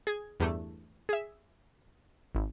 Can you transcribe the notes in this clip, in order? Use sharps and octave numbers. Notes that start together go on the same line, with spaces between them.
G#4 G#6
E2 G2 A3
G#4 E5
G#1